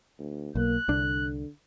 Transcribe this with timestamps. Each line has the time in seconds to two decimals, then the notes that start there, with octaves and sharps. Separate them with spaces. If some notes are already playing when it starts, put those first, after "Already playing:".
0.19 D2
0.55 B1 A#3 F#6
0.88 C2 D3 D4